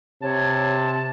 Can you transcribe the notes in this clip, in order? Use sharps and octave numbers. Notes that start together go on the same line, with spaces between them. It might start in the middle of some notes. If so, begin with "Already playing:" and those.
C3 C#5 A5